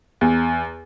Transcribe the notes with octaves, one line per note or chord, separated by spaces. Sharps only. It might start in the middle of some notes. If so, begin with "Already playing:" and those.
E2